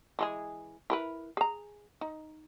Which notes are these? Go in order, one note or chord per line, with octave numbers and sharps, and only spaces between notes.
E3 G#3 G#4
E4 A#4 B4
G#4 A#5
D#4